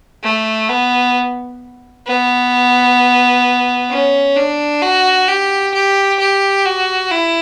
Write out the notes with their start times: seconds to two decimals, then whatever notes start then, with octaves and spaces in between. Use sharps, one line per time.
0.23 A3
0.69 B3
2.06 B3
3.90 C#4
4.36 D4
4.82 F#4
5.28 G4
5.74 G4
6.19 G4
6.65 F#4
7.11 E4